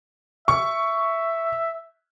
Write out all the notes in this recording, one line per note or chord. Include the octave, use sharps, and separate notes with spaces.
E5 C#6